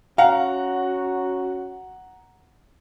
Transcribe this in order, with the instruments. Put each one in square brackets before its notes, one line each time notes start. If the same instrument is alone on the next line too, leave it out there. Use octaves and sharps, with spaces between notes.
[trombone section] C#4 F#4 [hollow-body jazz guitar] F5 [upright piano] F#5 A#5